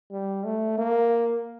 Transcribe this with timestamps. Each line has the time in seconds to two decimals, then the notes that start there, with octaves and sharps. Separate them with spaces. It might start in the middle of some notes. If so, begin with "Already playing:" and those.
0.11 G3
0.45 A3
0.78 A#3